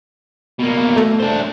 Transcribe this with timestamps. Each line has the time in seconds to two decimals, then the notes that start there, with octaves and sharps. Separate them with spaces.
0.59 B2 A#3
0.96 A3
1.19 D4 C5